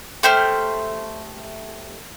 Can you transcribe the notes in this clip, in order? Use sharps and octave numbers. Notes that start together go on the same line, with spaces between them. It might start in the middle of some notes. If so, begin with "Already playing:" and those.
A3 G4 C5 F6